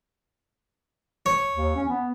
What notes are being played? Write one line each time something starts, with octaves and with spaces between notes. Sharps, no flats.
C#5
D#2
C#4
B3